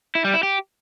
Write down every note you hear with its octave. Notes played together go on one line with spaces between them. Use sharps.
E4
G3
E4
G4